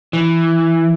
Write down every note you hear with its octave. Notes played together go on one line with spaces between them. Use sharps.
E3